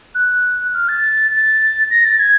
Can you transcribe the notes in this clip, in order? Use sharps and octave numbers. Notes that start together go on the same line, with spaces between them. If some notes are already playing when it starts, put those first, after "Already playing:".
F#6
F6
A6
A6
A#6
A6
G#6